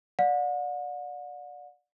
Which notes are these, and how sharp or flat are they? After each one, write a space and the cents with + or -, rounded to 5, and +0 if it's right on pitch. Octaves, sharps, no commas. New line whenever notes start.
D5 +0 F#5 -40